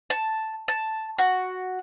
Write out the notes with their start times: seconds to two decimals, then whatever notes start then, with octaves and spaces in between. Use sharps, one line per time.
0.10 A5
0.68 A5
1.18 F#4